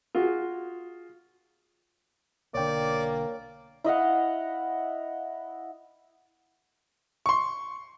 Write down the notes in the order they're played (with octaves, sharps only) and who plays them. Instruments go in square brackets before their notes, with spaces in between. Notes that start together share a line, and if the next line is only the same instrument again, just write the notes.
[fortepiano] F4 F#4 G#4
[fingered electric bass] B1 D3 [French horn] A#3 [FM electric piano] C#5 G5 [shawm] D5
[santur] E4 D#5 F5 F#5
[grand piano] C6 C#6